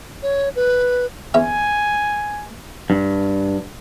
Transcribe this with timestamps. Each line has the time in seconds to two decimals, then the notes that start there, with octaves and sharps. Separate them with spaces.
0.23 C#5
0.56 B4
1.34 E2 C#4 E5 G#5
2.90 G2